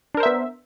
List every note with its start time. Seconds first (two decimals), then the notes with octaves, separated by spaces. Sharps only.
0.15 D4
0.17 A#4
0.20 C5
0.23 E5
0.26 B3